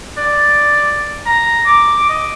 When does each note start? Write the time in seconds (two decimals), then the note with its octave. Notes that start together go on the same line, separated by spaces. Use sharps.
0.18 D5
1.26 A#5
1.66 D6
2.10 D#5